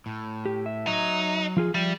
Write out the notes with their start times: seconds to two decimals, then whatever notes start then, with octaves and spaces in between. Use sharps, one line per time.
0.06 A2
0.46 G4
0.66 E5
0.87 F#3 D#4
1.57 F3 F4 G#4
1.74 F3 G3 E5